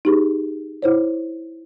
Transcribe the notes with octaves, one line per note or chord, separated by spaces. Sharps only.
D#4 G4 G#4
E4 C5 C#5